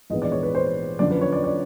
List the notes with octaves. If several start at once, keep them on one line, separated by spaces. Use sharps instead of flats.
A#1 G#2 E3 G#3 B3 D#5
D5
C#5
B4
C5
F#2 D3 F3 D5
B4
C#5
D5
D5